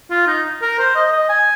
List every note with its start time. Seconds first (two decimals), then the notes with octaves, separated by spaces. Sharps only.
0.10 F4
0.27 D#4
0.62 A#4
0.79 C5
0.96 D#5
1.12 D#5
1.29 G#5